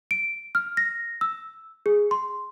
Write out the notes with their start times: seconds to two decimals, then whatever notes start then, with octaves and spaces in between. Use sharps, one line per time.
0.11 D7
0.55 F6
0.77 A#6
1.21 E6
1.86 G#4
2.11 C6